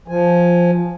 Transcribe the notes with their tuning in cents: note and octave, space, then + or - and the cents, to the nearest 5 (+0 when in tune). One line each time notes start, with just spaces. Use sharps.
F3 +0 G#5 +0